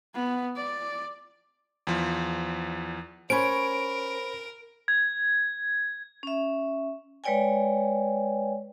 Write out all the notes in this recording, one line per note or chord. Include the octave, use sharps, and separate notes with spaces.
B3
D5
E2 F3
C#4 A#4 C5 C#5 B5 D7
G#6
C#4 E5
G#3 B4 C#5 D5 G5 G#5